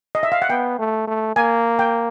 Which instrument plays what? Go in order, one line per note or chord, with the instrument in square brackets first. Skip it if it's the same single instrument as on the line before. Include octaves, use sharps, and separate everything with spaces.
[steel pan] D#5
E5
F5
F#5
[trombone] B3 [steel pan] G5
[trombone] A3
A3
[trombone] A#3 [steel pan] G#5
[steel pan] G5